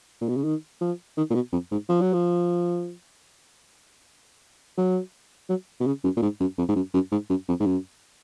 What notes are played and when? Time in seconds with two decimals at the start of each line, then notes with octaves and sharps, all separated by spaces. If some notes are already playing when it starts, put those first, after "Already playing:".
0.21 A#2
0.28 B2
0.36 C#3
0.44 D#3
0.81 F3
1.17 D#3
1.30 A#2
1.35 B2
1.52 F2
1.71 G#2
1.89 F3
2.01 F#3
2.13 F3
4.77 F#3
5.49 F#3
5.80 B2
5.86 C#3
6.04 F#2
6.17 A#2
6.22 G#2
6.40 F#2
6.58 F2
6.68 G#2
6.76 F#2
6.94 F#2
7.12 G#2
7.30 F#2
7.48 F2
7.60 G#2
7.66 F#2